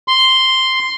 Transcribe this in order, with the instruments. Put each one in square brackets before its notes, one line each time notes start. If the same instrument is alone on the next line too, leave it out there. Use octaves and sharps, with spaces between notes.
[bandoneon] C6